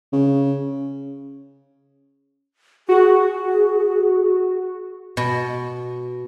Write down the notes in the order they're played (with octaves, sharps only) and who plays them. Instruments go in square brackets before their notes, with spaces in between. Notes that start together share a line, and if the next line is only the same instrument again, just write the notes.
[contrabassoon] C#3
[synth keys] F#4 [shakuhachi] G#4
[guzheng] B2